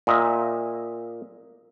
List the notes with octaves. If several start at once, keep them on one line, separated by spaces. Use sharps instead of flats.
A#2 D#5 E5